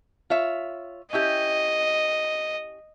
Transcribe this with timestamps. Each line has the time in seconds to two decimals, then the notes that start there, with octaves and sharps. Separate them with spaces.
0.30 F4 C#5 E5
1.13 C#4 E4 G4 D#5